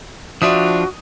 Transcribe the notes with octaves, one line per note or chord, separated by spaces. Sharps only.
F3 D4 F4 F#4 D5 E5 D#6